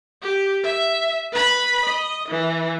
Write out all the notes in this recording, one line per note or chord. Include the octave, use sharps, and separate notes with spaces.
G4
E5
B4 B5
D#5
E3